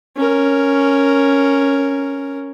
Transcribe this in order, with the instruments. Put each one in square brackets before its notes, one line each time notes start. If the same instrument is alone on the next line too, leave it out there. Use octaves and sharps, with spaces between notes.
[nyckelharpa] C#4 A#4